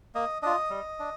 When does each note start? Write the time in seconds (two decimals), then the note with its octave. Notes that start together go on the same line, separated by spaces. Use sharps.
0.15 A#3 D#5
0.42 D4 F4 D#5
0.70 G3
1.00 D4